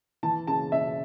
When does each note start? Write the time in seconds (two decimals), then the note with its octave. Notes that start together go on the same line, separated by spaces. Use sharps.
0.23 E3 A5
0.47 C#3 A5
0.72 C#3 E5